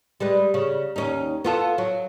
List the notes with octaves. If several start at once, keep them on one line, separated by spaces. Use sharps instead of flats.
G3 G#3 B4
C#3
D#2 C#4 D#4
B3 F4 A4
F#3